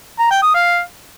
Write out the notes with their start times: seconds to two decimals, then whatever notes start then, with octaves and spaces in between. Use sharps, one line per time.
0.19 A#5
0.31 G5
0.42 D#6
0.54 F5